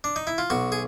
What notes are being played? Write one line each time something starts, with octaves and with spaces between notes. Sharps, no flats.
D4
D#4
E4
F4
B1 F#4
G#4